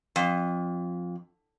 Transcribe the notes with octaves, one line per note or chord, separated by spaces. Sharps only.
F2